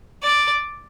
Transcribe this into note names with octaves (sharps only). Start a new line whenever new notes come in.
D5